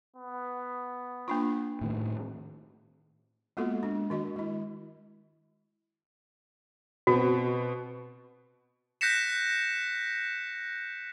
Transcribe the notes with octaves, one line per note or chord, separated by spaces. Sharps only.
B3
A#3 D4 F4
A2 D#3
G#3 A#3 B3 F4 F#4 A4
G#3 D4
D#3 F#4 D#5
G#3 E4
B2 B3 C4 F#4
F#6 G6 A#6 B6 C#7 E7